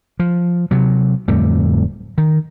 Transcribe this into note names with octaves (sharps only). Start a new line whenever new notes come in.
F3
C3 F#3
D1 F2 G3 A3
D#3